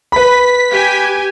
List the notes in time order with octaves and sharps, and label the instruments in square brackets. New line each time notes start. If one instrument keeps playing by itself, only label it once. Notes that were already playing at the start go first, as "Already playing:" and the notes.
[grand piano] B4 B5 [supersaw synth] B6
[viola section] G4 G#5